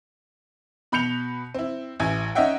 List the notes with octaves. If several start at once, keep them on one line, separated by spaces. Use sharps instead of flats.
B2 B5 G6 C#7 F7
C4 E4
A1 E4 G#5 G#6
C#4 D#4 D#5 E5 F#5 G5